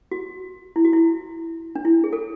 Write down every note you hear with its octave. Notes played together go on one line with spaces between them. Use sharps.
F#4
E4
F#4
E4
D4
E4
G#4
A4